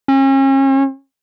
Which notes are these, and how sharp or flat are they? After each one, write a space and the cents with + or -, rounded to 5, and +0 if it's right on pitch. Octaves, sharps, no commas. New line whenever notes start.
C#4 -40